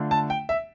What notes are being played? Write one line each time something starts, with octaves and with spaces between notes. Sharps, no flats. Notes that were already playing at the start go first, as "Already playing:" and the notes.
Already playing: D3 A3 D4 F4
A5
G5
E5